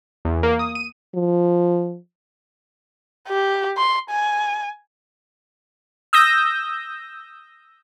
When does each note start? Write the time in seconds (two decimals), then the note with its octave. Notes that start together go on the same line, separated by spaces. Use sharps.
0.25 E2
0.43 A#3
0.59 D#6
0.75 D#7
1.15 F3
3.29 G4
3.77 C6
4.10 G#5
6.13 D#6 E6 G6 A#6